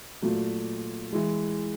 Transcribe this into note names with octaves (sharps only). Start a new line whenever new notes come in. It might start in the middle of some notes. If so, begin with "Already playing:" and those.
A#2 F#3 A3
E3 G#3